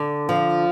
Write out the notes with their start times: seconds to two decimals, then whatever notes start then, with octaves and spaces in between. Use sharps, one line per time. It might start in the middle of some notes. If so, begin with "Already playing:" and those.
Already playing: D3
0.29 F3